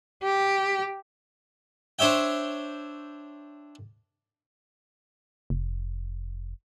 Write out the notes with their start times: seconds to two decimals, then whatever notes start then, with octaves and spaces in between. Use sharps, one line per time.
0.24 G4
1.99 D4 C5 C#5 E5 G5
5.50 F1